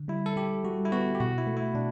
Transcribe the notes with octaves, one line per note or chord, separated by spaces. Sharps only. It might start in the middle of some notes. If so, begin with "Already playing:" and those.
Already playing: D3
G3 E4
A4
G3 G4
G3 F#4
E4
B3 F#4
G4
B2 F#4
E4
A3
E4
B2 D4